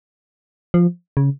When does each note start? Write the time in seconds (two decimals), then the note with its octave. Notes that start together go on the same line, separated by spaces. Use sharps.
0.74 F3
1.17 C#3